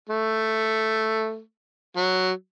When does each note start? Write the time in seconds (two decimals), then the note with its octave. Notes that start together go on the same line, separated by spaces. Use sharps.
0.09 A3
1.97 F#3